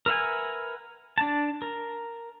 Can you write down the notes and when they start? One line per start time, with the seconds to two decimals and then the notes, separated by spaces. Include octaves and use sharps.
0.06 A#4 B4 E5 F#5 G#5
1.18 D4 A5
1.62 A#4